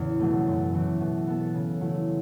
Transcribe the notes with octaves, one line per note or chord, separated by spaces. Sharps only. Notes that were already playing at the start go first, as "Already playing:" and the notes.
Already playing: E2 A2 C#3 E3 C#4
B2 F#3 A3
F#2
E3 A3
B2
B3 A4
C#3
F#3 A3 E4